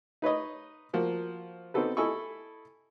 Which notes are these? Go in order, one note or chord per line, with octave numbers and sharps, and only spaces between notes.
D#4 B4 C#5 D#5
F3 A#3 F#4
B3 C4 D#4 F#4 A4 B4
E4 A4 D#5 G#5 B5 C#6